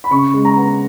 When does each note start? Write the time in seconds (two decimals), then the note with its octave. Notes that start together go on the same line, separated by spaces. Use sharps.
0.04 B5
0.11 C#3 C#6
0.34 G#3
0.45 A#5
0.56 B3